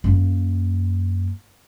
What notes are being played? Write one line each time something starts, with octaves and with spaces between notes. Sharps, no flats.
F#2 A#3